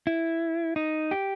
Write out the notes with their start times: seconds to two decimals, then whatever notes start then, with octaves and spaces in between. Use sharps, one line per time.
0.07 E4
0.76 D#4
1.11 G4